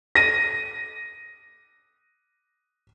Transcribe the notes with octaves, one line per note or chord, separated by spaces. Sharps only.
A#6 D#7